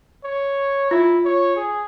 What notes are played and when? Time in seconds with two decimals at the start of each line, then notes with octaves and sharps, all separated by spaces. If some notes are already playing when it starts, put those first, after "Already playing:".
0.24 C#5
0.91 E4 F4
1.25 C#5
1.56 G#4